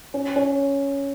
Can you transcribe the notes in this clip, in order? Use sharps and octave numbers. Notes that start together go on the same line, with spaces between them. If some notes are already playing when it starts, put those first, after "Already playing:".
C#4
C#4